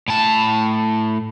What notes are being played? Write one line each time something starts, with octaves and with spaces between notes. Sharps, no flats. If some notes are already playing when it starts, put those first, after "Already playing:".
A2 A5